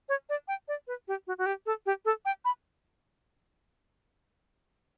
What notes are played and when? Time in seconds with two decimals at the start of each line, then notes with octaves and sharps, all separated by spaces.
0.09 C#5
0.29 D5
0.48 G5
0.68 D5
0.87 B4
1.08 G4
1.27 F#4
1.38 F#4
1.46 G4
1.66 A4
1.86 G4
2.05 A4
2.25 G5
2.45 B5